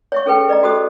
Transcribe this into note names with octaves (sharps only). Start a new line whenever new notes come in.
C#5 E5 C#6
C#4 G#4 A4 B4 G5
B4 D5 D#5 A#5
F#4 G4 A4 C5 D#6